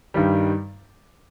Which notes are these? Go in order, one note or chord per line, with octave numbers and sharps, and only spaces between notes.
G2 D#3 G3